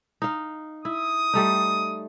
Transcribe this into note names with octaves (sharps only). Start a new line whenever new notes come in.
D#4 F5
E4 D#6
G3 A3 D#4